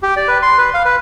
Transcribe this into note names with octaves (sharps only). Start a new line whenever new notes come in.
G4
D5
B4
C6
B4
F5
B4